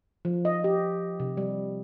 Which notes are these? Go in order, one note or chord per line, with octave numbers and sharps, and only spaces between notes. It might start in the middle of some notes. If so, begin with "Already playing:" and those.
F3
D#5
G4
C3
G3